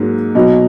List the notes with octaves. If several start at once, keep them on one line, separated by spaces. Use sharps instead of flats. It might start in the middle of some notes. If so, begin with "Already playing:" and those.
Already playing: G#2 F#3 A#3
B2 F#3 B3 D#4